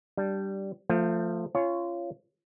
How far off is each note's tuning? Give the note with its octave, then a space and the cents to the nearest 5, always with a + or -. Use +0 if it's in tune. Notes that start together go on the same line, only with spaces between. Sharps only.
G3 -10 D4 +0
F3 +0 A3 +25
C#4 +0 F4 -20 C#5 +0